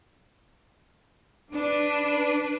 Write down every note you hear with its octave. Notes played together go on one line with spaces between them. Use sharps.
D4 B4